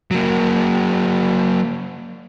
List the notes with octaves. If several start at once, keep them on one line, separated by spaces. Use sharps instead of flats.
F#3 A#3